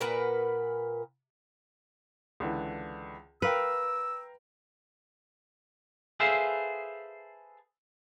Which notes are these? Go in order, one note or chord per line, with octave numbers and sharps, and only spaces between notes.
A#2 A#4 B4 F#5
C#2 D3 E3
A#4 B4 F5 G5 E6
G#4 A4 B4 C5 E5 F5